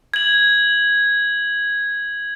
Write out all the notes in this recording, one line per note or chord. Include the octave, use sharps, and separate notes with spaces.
G#6 F#7